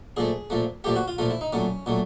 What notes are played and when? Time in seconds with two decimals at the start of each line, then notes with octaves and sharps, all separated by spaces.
0.17 A#2 F3 A3 G#4
0.50 A#2 F3 A3
0.84 A#2 F3 A3 G4
0.96 F#4
1.08 F4
1.18 A#2 F3 A3 F4
1.30 E4
1.41 D#4
1.53 A#2 F#3 A3 C#4
1.86 A#2 F#3 A3